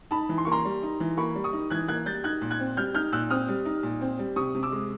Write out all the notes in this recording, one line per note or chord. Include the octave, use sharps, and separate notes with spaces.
D#4 A5 B5
E3
C6
A#3 C#6
A#5 C6
G3
D#4
E3
A#3 B5 C#6
G3
C#6 D#6
D#4
E3 F#6 G#6
A#3 F#6 G#6
G3 G6 A6
D#4 F#6 G#6
A#2
F#6 G#6
C4
G3 F6 G6
D#4 F6 G6
A#2 E6 F#6
C4 D#6 F6
G3
D#4
A#2
C4
G3
C3 C#6 D#6
C3
D6 E6
G#3